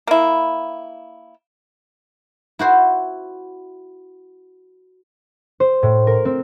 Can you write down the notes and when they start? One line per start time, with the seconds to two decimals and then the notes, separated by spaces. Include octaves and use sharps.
0.07 A#3 E4
2.59 E4 F#4 C5
5.60 C5
5.83 A2
6.07 A#4
6.25 C4